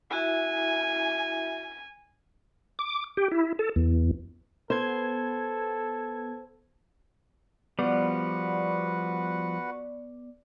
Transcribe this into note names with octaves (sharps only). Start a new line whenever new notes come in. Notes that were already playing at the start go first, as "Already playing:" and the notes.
E4 F#4 E5 G#5
D6
G4
E4
A4
E2
B3 A4 C5 G#6
F3 G3 B3 F#4 B4 D5 F#5